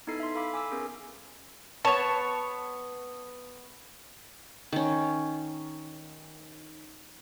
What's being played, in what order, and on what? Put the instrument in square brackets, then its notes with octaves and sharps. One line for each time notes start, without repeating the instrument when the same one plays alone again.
[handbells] B3 D#4 E4 A4 C7
E5 C6
A4 F5 B5 D6 B6
G#5 D6 E6
B3 C#4 G#4 A#4
[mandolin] B3 C#5 [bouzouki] A5
[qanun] D#3 C#4